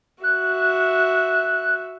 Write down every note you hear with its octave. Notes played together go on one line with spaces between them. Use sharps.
F#4 E5 F#6